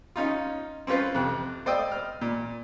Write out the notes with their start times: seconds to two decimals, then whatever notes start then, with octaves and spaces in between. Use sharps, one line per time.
0.16 C#4 D#4 F4
0.87 C4 C#4 F4 B4 C5
1.15 F2 C3 F#6
1.66 C5 D5 D#5 G5 D#6 E6
1.92 F6
2.21 A#2